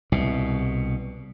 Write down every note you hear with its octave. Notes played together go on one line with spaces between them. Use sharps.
C2 B2